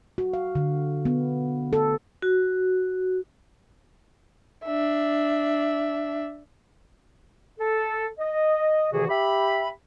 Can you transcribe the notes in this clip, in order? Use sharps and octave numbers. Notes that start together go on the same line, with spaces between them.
F#4
F5
D3
B3
A4
F#4
D4 E5
A4
D#5
D2 C3 D#3 E3 F#4 G#4
G4 E5 B5